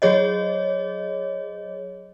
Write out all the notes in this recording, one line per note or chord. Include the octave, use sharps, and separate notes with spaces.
F#3 G#4 C#5 D#5